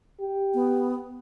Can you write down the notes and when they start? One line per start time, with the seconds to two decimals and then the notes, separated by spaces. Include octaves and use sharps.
0.20 G4
0.54 B3